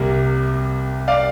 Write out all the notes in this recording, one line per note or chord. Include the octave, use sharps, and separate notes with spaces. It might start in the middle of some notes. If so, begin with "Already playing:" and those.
Already playing: C2 C3 G3 A#3
D5 F5